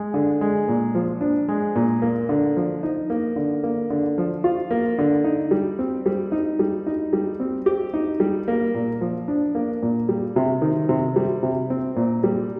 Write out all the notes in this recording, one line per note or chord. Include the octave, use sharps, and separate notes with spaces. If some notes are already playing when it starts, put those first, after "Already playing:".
Already playing: G#3
D3
G#3
A#2
F3
D4
G#3
A#2
A#3
D3
F3
D#4
A#3
D3
A#3
D3
F3
F4
A#3
D3
D#4
G3
C4
G3
D#4
G3
D#4
G3
C4
G4
D#4
G3
A#3
A#2
F3
D4
A#3
A#2
G3
C3
D#3
C3
G3
C3
C4
A#2
G3